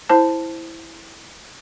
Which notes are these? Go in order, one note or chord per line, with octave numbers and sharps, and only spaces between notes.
E4 C5 A5